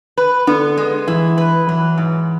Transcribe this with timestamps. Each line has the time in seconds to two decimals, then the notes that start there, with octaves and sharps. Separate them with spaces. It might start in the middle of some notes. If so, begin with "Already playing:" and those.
0.17 B4
0.47 D3 B3
0.77 G#3
1.08 E3 E4
1.38 B4
1.67 E3 F#3
1.98 G#2